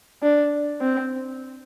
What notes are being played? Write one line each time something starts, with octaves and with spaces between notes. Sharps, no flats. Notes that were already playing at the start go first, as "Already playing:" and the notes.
D4
C4